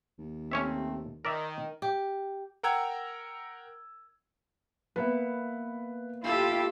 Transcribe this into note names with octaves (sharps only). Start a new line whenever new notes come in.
D#2
C3 A3 C4 C#4 C#5 E5
D#3 A#4 D5 E5
G4
A#4 F#5 G5 A#5 E6 G#6
A#3 B3 B4 E5
E4 F4 G4 A4